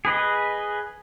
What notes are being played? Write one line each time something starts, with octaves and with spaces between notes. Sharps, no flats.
G#4 B4 D#5